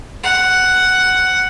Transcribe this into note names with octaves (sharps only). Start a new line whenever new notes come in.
F#5